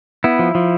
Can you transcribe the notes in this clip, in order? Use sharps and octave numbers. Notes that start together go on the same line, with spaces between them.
B3 E4
F3
F3